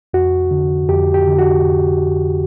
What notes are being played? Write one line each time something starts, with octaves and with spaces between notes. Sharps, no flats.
F2 F#4
D3
F2 G4
G4
D3
F#4